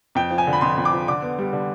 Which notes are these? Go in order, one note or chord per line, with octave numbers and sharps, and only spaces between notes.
F2 G5
F3
G#5
D3
B5
F2 C6
F2
D6
F3
D3 D6
B3
G3
D3